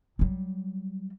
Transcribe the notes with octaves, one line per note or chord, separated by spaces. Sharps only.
F#3 G3